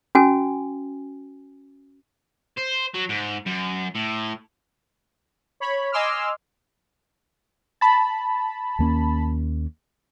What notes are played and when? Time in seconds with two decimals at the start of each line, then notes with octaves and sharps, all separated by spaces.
0.15 C#4 F#4 G#5
2.58 C5
2.95 F#3
3.09 G#2
3.46 F#2
3.95 A2
5.60 C#5 B5
5.92 D#5 G#5 C6 D6 E6 F6
7.81 A5 B5
8.79 D#2 A#3 C#4